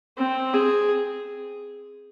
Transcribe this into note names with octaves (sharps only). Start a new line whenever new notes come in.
C4
G#4